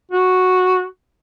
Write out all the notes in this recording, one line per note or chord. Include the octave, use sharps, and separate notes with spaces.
F#4